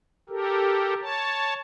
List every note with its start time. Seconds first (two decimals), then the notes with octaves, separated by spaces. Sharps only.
0.29 G4 A4 A#4
1.01 C#5 A5